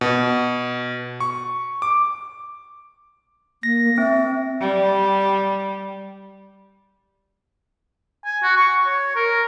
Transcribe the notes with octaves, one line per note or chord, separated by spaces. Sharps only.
B2
C#6
D6
A#3 A#6
C4 E5
G3
G#5
F#4
C#6
C#5
A#4